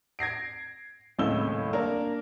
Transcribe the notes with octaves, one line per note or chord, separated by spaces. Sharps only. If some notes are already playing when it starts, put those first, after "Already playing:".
G#6 A#6 C7 D7
D#1 C#2 A2 E4 E6 G7
A#3 D4 A#4